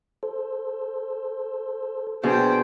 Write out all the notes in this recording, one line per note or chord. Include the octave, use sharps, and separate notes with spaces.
A4 C5
B2 D4 G#4 C5 G5